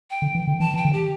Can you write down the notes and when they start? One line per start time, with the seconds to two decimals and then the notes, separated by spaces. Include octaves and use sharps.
0.10 G5
0.22 D3
0.35 E3
0.47 D3
0.60 E3 A5
0.74 E3 G5
0.85 D3
0.93 G4